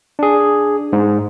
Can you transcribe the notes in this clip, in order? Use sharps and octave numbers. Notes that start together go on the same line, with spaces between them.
D4 G#4
G#2